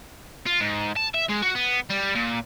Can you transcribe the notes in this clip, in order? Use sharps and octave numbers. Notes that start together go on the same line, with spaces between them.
F4
G#2
A5
E5
G#3
F#4
B3
G3
A#2